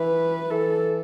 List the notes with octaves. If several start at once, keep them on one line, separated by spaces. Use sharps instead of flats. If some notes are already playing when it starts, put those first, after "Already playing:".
Already playing: E3 B4
E3 A4